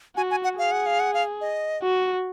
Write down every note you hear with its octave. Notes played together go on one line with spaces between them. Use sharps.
F#4 G#5
G#5
F#5
G#4 F5
F#5
F5
F#5
F5
D#5
F#4